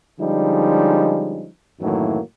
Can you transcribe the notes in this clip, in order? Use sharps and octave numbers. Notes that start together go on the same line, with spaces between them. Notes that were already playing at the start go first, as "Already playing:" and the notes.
D3 F3 G3 G#3 C#4 D#4
F#2 A2 D#3 E3 F#3 A#3